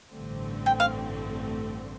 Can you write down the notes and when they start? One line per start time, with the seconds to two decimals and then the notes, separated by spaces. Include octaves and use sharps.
0.12 A1 G2 D3 A3 C4
0.66 G5
0.80 F5